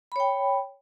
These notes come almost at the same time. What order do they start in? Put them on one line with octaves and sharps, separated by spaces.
B5 C#5 G5